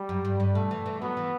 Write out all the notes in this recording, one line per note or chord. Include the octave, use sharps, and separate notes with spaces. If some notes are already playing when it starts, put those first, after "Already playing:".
Already playing: G3
F#2
G2
G2
B2 A3
E3
E3
F#3 B3
E3